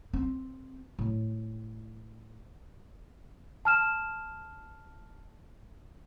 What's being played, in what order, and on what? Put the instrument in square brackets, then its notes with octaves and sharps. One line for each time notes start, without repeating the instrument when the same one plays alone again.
[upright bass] C4
A2
[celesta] A5 F6 E7